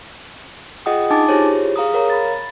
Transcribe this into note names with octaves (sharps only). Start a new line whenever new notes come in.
F4 G#4 D#5 F#5 G5 D#6
D4 D#4 G#5 A5 D6 A6
E4 F4 G4 G#4 C5 C#5
G#4 F5 A#5 D#6
A#4 C#5 F5 A#5
B5 A6